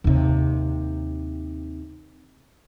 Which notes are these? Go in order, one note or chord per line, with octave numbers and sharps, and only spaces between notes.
D#2 C3